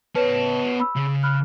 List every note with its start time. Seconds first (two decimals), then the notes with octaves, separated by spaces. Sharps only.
0.16 B3 B4 C#5 A5 E7
0.80 B5 E6
0.96 C#3
1.23 B5 F6 F#6